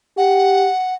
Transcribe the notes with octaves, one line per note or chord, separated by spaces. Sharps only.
G4 F#5